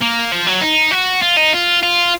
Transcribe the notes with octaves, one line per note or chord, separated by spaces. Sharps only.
A#3
F3
F#3
D#4
F#4
F4
D#4
F4
F4